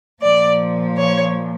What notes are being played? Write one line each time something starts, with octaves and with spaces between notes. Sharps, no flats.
A#2 F3 D5
C#5